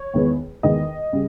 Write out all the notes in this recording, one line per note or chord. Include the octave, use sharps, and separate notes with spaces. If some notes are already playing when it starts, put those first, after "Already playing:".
Already playing: C#5
E2 D#3 G#3 B3
E2 D#3 G#3 B3 D#5
C#3 G3